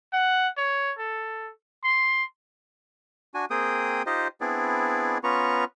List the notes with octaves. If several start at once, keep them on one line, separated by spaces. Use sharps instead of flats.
F#5
C#5
A4
C6
D4 F#4 G#5
A#3 C4 G#4 G5 D#6
D#4 F4 G4 C5 D#5
B3 C4 D4 E4 G#4 D5
B3 C#4 F4 B4 A#5 C#6